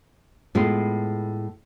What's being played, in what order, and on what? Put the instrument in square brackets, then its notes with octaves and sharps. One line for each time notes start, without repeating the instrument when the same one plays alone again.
[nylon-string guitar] A2 G#3 B3 F4